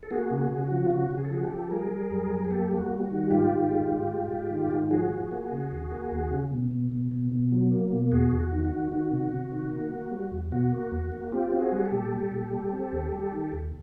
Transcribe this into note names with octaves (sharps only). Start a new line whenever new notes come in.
A4
A#3 F#4 G#4
C#3
F#4 G#4
C#3
F#4
F3
F4
C#3 F#4
C#3
G#4
A4
F3 F#4 G#4
G4 A4
F3
G3 G#4 A#4
G3
F#2
F#2
G#4
A#3 G4 A4
G3
F#4
G3
F#4
D#3
G#2 F4 G4
D#3
G#3
G#2
G#3
G#2
D#3
G#2
F3 F#4 G#4
F3
A#3
C#3
D#2
A#3
D#2
C#3
B2
B2
B2
B2
B2
F#3
A#3
B2
E2 F#4 G#4
E2
F#4
D#3
F#4
D#3
D#3 F#4
C3
C3
D#3
A#3
A#3
G3
E2
B2 F#4
A#3
E2
A#3
C4 F4 G4
C4
F#4 G#4
G3
G4 A4
A#2
G3
A#2
G3
C4
D#2
G3
D#3
D#2